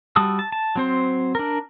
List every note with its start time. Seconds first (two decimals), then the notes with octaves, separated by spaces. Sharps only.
0.16 G3 F#4 A5 D#6 E6
0.39 A5
0.52 A5
0.76 F#3 C4 C5
1.35 D4 A#4